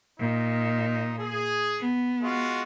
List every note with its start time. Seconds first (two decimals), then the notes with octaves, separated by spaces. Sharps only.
0.19 A#2 D#4
1.19 G#4
1.80 B3
2.22 G#3 F4 F#4